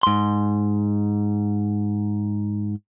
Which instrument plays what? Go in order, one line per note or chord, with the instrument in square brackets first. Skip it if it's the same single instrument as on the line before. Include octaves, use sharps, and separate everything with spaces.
[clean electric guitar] G#2 C6